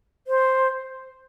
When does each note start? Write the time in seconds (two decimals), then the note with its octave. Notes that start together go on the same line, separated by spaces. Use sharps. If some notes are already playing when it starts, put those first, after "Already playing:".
0.27 C5